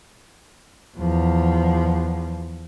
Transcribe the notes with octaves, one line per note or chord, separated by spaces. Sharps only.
E2 F3